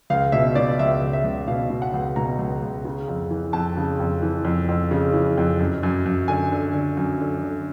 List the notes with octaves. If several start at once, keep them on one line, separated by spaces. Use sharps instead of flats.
C#2 F5
B2 E5
B2 D5
C#2 E5
C#2
E5
C#2
B2 F5
B2
F#5
C#2
B2 A#5
C#2
C#2
C#3
F2
E3
F2 A5
C#3
F2
E3
F2
F2
C#3
E3
F2
F#2
F#2
F#2
D3 G#5
D3
D3
F#2
D3
D3